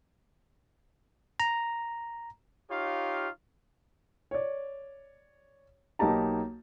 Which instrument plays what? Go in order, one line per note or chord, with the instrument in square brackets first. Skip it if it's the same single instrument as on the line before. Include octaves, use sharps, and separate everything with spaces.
[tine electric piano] A#5
[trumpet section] D#4 F4 G4 C#5 F5
[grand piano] C#5 D5
B1 A#3 D#4 G4 A5 A#5